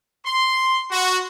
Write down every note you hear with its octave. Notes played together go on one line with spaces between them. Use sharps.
C6
F#4